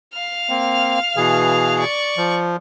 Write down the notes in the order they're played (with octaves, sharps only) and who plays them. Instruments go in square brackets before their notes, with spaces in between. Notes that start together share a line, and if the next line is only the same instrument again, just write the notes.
[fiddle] F5 F6
[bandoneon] A#3 C4
B2 E3 G#4
[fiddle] D5 C#6
[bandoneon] F3